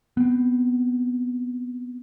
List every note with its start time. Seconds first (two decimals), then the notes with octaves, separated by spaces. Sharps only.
0.17 B3 C4